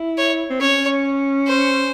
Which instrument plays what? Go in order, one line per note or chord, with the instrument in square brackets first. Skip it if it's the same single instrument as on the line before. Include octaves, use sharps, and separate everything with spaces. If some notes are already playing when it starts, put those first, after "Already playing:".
Already playing: [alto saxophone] E4
[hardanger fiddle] C#5
[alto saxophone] C4
[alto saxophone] C#4 [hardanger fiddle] C#5
[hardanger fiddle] C5